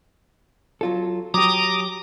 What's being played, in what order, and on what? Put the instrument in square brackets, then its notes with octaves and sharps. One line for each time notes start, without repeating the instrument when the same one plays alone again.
[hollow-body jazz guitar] F#3 F4 A4
[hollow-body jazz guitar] F#3 G4 [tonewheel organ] A#5 D6 D#6